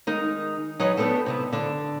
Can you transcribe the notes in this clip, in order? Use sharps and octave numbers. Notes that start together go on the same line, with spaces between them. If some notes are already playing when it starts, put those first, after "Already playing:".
D#3 G#3 D#4
F#3 D#4 G#4 B4 C#5
A3 B3 D4 G4 A4
C3 B3 E4
D3 D4